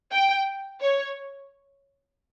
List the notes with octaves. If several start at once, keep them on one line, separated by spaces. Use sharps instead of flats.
G5
C#5